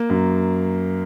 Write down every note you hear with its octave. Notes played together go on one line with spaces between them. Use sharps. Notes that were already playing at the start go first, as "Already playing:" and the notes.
Already playing: A#3
F#2